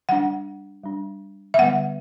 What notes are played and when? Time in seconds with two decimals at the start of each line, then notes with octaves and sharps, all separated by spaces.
0.09 G3 D4 F#5
0.84 G3 D4
1.54 E5
1.58 D3 G3 B3 F#5